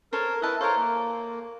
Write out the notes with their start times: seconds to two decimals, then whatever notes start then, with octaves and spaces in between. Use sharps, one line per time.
0.13 A4 A#4 C5 C#5
0.42 E4 B4 D#5 A5
0.61 A4 A#4 C5 C#5 F5
0.76 A#3